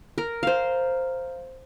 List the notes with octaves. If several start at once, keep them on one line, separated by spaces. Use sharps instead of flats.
A#4
C5 F5